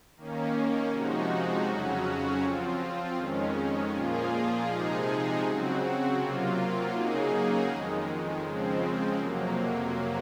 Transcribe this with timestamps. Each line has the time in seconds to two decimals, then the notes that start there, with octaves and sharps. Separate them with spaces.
0.16 D#3 A#3 C#4
0.90 C3 F3 G#3 D#4 F#4
1.66 F2 C#3 F#3 C#4 F#4
2.41 F3 C4 F4
3.16 F2 D#3 G#3 C#4
3.91 A#2 F3 A#3 F4 G#4
4.67 C3 F3 G#3 D#4 G#4
5.42 C#3 F#3 C4 F#4
6.17 C3 F#3 A#3 F4
6.92 C#3 F#3 A#3 D#4 G#4
7.67 F2 D#3 G#3
8.42 C#3 F3 G#3 C4
9.18 F2 C3 F#3 A#3